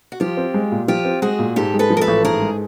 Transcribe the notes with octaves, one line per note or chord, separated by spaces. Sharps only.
F#4
F3 F4 G4
C4
G#3
A#2
F3 F4 G4
C4
G#3 F#4 G#4
A#2
G#2 G4 A4
G#3
A4 B4
F3
A#4
A4 B4
A1
G#2 G#4 A#4
G#3